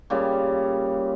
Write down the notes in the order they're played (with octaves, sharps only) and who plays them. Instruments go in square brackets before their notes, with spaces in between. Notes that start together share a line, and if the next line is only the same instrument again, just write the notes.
[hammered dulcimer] A#2 C#3 G3